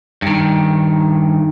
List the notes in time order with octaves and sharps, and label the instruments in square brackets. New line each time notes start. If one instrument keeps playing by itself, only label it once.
[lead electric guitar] G2 D#3